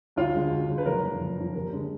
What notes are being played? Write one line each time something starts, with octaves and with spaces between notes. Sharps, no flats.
D2 F4
D3 G#3
D2
D3 G#3
B4
F#1 A#4
F2 F3
F#1
F2 F3
D#2 A#4
D3 G#3